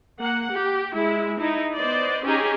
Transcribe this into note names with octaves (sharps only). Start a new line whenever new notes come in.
A#3 F#5
G4
G#3 E4
D#4 E4
B3 C5 D5 D#5
C#4 D#4 G4 G#4 G#5 A#5